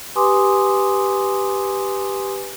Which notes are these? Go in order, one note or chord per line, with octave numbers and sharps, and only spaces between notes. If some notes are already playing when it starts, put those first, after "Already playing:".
G4 B4 G#5 C6 D6 D#6